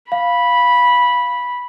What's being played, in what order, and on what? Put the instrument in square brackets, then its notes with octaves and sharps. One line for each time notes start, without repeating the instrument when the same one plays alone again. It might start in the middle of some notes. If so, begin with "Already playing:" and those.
[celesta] F5 [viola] B5